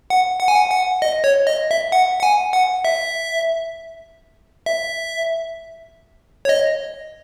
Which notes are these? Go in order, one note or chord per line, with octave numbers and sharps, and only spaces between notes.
F#5
F#5
G#5
F#5
F#5
D#5
C#5
D#5
E5
F#5
F#5
G#5
F#5
E5
E5
C#5
D#5